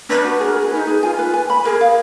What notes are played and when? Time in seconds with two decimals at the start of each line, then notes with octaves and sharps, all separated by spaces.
0.09 D4 B4
0.25 F#4
0.40 G#4 A#4
0.56 G#4
0.71 D#4 B4
0.87 G#4
1.02 F4 G#5
1.19 B4
1.34 G#5
1.50 B5
1.64 G#4 A#4
1.81 F5